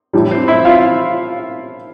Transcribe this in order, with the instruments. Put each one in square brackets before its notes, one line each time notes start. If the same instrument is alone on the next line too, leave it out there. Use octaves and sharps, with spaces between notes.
[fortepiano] A2 E3 G3
C4 C5
E4 E5
F4 F5